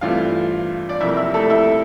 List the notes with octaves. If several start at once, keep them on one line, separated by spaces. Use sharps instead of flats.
G2 E3 A3 C4 F4 F5
D5
F2 C3 G3 A#3 E4 E5
E4 E5
A3 A4
E4 E5